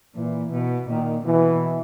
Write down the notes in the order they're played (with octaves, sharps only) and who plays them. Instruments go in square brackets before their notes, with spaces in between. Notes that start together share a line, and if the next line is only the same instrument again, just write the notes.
[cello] A#2 [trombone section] E3
[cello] B2
[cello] A#2 [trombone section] D#3
[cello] B2 [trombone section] E3